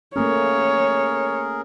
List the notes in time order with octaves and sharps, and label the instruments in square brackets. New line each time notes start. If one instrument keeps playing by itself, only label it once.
[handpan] A3 A#3 C#4 [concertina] G#4 A#4 [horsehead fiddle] C#5